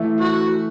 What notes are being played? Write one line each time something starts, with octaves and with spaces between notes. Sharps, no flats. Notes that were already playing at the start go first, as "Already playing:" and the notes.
Already playing: E3 A3 E4
F#4